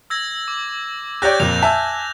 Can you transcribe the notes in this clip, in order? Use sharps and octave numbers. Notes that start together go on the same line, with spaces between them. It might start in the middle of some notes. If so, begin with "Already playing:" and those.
E6 G#6 A#6
D6
G4 C#5 D5 F#6 G6 A#6
F2 A#2 F7
E5 G#5 A5